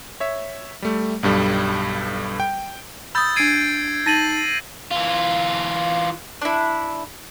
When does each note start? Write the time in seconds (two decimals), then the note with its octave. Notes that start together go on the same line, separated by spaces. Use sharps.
0.20 C#5 E5
0.82 G3 A3
1.23 B1 G2 G3 A4
2.40 G5
3.15 B5 D#6 E6 G6 A6
3.36 D4 G#6 C7 D7 D#7
4.06 D#4 A5 A6 A#6 D#7 F#7
4.91 E3 F4
6.41 D4 E4